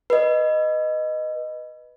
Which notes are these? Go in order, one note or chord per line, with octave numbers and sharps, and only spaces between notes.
B4 D#5